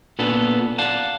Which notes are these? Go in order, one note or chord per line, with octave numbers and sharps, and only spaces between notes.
A#2 B3 D4 A4
D5 F5 F#5 A5